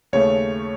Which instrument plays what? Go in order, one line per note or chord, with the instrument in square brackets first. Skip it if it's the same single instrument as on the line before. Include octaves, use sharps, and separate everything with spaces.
[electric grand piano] D#2 C#3 A3 C#5